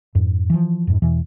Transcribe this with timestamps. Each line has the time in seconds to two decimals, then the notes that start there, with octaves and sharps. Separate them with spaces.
0.15 F2 G#2
0.50 E3 F3
0.87 F2 G#2
1.02 E2 B2 E3